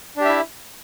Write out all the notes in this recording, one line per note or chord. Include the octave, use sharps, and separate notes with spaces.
D4 E4 G4 E5